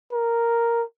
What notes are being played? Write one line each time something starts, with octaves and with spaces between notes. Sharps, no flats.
A#4